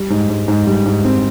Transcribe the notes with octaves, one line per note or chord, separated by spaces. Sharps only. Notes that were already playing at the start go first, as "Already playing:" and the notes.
Already playing: G3
G#2
G#2
G#2
G3
G#2
C4